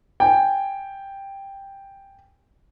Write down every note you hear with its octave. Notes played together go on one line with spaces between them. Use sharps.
G5 G#5